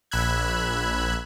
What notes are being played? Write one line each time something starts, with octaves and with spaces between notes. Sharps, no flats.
A#1 B5 E6 F#6 G#6